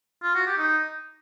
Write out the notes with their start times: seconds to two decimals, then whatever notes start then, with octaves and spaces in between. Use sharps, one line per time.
0.23 F4
0.35 F#4
0.47 G4
0.58 D#4